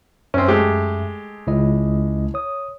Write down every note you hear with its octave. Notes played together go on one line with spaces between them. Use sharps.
F#2 C4 C#4 E5
G#3 A3 G4
C#2 E4 D#5
C#5 D#6